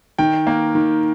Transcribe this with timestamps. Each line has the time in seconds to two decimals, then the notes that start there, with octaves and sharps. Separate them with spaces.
0.18 D#3 G5
0.47 A#3
0.75 D#3